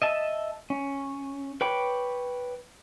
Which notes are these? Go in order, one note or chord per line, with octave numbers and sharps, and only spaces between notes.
D#5 E5 A5
C#4
B4 C#5 G5 B5 D6